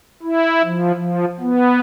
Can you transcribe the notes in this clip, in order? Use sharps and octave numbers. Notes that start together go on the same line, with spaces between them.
E4
F3
F3
B3